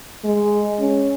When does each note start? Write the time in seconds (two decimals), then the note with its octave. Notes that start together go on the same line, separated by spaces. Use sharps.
0.24 G#3
0.80 C#4